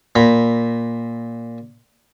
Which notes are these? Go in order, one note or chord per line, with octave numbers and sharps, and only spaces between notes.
A#2 A#5 B5